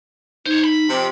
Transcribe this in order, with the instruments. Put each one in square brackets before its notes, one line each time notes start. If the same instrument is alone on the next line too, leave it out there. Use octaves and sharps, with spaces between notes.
[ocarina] D#4 [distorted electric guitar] C5 C#5
[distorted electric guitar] B5
[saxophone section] F2 C3